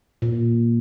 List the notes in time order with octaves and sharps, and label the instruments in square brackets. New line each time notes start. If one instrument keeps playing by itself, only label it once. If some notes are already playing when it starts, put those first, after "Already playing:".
[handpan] A#2